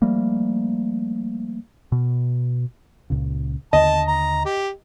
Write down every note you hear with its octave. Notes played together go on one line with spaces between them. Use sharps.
F3 G3 A3 A#3
B2
C#2 A#2 C#3
D#2 D3 D#5 A5
A#5
G4